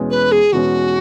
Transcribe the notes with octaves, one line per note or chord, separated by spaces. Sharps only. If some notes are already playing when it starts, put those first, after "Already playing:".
Already playing: E2 B2 G#3 C#4
B4
G#4
E2 B2 G#3 C#4 F#4